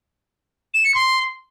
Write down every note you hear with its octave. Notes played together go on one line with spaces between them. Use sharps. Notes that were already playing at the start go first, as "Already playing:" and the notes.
E7
C#7
C6